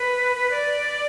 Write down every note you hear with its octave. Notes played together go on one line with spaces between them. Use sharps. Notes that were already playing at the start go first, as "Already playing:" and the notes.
Already playing: B4
B4
D5